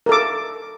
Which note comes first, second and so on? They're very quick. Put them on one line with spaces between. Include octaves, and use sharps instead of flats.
A#4 A4 D6